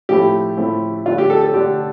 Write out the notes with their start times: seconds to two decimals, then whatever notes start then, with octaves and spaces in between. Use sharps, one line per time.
0.09 A2 F3 A3 C4 E4 G4
0.57 A2 F3 A3 C4 E4
1.05 D3 A3 D4 F4
1.18 G4
1.30 A4
1.42 A4
1.54 D3 A3 D4 G4